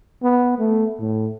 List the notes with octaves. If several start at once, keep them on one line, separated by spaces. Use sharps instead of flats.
B3
A3
A2